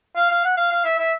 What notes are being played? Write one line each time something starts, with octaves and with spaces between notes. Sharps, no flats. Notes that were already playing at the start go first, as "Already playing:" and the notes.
F5
F5
F#5
F5
F5
E5
E5